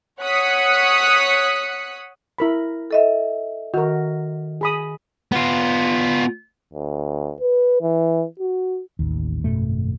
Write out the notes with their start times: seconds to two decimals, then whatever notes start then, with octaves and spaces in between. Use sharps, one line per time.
0.22 C#5 F#5 D#6 F#6 B6 C#7
2.39 E4 A#4 B5
2.91 A4 D#5 E5
3.74 D#3 F#4 A#4
4.61 G#4 B5 D#6
5.32 B3 F4
6.73 D2
7.40 B4
7.81 E3
8.39 F#4
8.99 A1 D#2
9.44 G#1 F#2 B2 A3